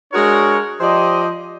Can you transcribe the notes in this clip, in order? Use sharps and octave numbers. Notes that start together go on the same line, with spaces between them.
G#3 D4 F#4 G#4 A#4 C#5
F3 G4 C5 D5 D#5